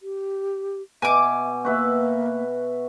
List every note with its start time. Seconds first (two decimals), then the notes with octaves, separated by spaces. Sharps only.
0.02 G4
1.02 B2 E5 G#5 D6
1.65 A#3 F#4 B4 E5